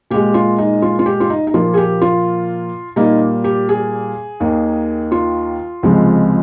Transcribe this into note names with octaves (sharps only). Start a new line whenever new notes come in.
A#2 G#3 G4
F4
D#4
F4
F4
G4
F4
D#4
D#4
A#2 F3 A#3 F4
G#4
G4
F4
A#2 G3 A#3 D#4
G4
G#4
D#2 D#3 A#3
F4
C#2 C3 F3 G#3